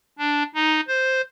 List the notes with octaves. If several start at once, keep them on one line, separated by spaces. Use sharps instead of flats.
D4
D#4
C5